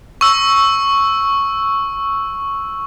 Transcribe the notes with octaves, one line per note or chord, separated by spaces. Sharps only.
C#6 E6